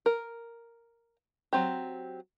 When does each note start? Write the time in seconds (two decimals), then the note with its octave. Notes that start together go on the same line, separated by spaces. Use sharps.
0.06 A#4
1.53 F#3 C4 G4